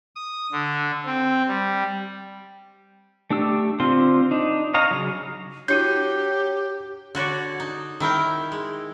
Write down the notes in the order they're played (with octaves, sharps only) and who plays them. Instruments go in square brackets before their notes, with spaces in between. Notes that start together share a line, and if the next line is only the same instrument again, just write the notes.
[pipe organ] D#6
D3
C4
G3
[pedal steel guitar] A3 D4 G4 E6
D3 C4 F4 C5 C6
D4 D#4
C#5 D#5 F5 A#5
C#3 F#3
[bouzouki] F#3 [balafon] D4 E4 F#4 [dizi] G4 [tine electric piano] G6
[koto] D3 F#4 C#5 D5
D#4
D#3 E4 A#4 G5
G#3